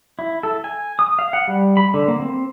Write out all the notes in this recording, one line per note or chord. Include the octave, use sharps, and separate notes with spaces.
E4
A4
G#5
D#6
F5
F#5
G3
B5
D3
A#3
C4